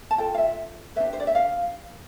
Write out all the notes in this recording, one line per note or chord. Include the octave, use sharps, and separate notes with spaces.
A5
F4 A4 G5
F5
E5
D4 G4 B4 E5
C5
D5
E5
F5